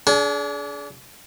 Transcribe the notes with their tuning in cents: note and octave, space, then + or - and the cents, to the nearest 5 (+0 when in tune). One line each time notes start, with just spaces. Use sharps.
D4 -30 G#4 +30